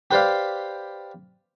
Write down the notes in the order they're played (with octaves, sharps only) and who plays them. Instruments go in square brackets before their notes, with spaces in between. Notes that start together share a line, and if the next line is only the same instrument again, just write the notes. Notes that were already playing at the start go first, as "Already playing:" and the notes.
[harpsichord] G4 B4 C5 D5 F5